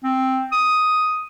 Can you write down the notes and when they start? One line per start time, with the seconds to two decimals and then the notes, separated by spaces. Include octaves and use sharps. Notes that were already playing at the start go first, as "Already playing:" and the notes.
0.04 C4
0.52 D#6